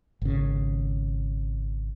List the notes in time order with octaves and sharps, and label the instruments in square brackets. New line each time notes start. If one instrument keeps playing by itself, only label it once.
[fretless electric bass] G#1 C#3